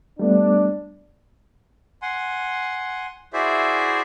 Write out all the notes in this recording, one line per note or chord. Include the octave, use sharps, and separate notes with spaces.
G3 A3 B3 D4
F#5 G#5 C6
E4 F#4 G#4 C5 D5 E5